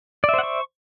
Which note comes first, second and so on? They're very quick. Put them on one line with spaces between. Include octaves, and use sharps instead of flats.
D5 E5 C5 F#5 C#6